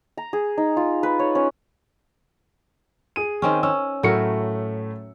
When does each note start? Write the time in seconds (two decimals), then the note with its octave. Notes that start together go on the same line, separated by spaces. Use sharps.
0.17 A#5
0.33 G#4
0.58 D#4
0.77 F4
1.03 B4
1.19 C#5
1.35 C#4
3.16 G#4 D#7
3.42 D#3 C4 C#4
3.63 C#4 E6
4.03 A2 F#3 A3 A#4 C#7